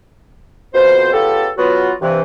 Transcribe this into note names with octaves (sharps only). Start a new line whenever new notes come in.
F2 B2 C5
C#3 B3 F4 G4 A4
F#3 B3 F4 F#4
G2 C3 E3